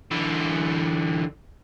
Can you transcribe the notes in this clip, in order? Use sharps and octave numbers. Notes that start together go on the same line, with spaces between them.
D3 E3